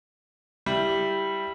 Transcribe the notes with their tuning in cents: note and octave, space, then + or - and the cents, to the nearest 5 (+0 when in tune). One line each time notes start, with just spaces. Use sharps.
G3 +0 E4 +0